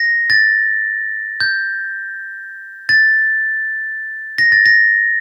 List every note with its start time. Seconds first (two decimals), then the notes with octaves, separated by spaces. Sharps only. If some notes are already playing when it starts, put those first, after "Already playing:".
Already playing: A#6
0.30 A6
1.40 G6
2.89 A6
4.38 A#6
4.52 A6
4.66 A#6